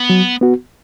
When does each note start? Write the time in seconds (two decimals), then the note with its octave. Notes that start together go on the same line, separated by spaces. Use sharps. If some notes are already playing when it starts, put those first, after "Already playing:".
Already playing: B3
0.10 F#3
0.41 B3 F#4